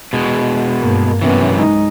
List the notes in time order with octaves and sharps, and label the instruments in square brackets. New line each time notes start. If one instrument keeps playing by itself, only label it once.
[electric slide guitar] B2 G#3
[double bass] G2 A#3
[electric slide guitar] F#2 C3 E3 [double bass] B3 C#4
[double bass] G#3 D#4